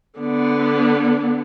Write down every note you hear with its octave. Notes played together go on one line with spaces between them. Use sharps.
D3 B3